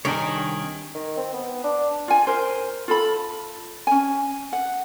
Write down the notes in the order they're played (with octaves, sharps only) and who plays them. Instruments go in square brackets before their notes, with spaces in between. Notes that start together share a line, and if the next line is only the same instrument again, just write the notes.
[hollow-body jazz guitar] C2 D4 A#5 [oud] D#3 [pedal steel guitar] C#5 G5 G#5
[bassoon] D#3
C4
B3
D4
[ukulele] F4 G#5
A#4 C5
F4 A4 B5
C#4 G#5
F#5